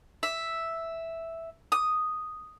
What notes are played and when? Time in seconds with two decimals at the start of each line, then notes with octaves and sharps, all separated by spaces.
0.23 E5
1.72 D#6